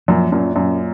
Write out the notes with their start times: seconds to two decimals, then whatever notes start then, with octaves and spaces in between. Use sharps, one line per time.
0.08 F#2 A#2 F3
0.32 F#2 A#2 C#4
0.56 F#2 A#2 C#4